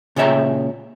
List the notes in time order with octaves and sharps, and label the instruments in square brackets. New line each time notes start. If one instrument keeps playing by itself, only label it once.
[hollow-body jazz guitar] A#2 C#3 C#5 E5 G5 A#5